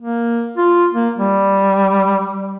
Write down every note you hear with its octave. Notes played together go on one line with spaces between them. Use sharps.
A#3
F4
A#3
G3